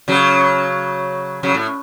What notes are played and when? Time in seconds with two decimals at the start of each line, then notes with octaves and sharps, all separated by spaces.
0.08 C#3 F#3
1.43 C#3 F#3
1.54 A2